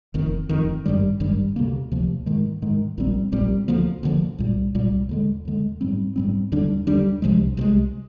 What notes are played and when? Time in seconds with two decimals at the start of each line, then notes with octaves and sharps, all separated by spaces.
0.14 F1 F2 D#3
0.49 F1 F2 D#3
0.86 G#1 G2 D#3 G3
1.20 G#1 G2 D#3 G3
1.56 D2 C3 F3 A#3
1.92 D2 C3 F3 A#3
2.26 G#2 D#3 G#3
2.62 G#2 D#3 G#3
2.97 A#1 A#2 G3 C4
3.32 A#1 A#2 G3 C4
3.68 D2 D3 F3 A#3
4.03 D2 D3 F3 A#3
4.38 C2 A#2 G3
4.75 C2 A#2 G3
5.09 D#2 D3 G#3
5.45 D#2 D3 G#3
5.81 G#2 G3 C4
6.16 G#2 G3 C4
6.52 D#2 D3 G3 D4
6.87 D#2 D3 G3 D4
7.22 C2 C3 F3 G#3
7.57 C2 C3 F3 G#3